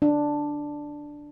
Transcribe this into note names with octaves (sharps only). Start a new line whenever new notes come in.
D4